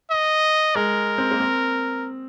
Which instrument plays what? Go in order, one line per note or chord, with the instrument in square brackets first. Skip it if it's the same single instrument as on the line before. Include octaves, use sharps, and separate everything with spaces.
[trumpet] D#5
[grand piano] G#3 [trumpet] A#4
[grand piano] C4
A#3
C4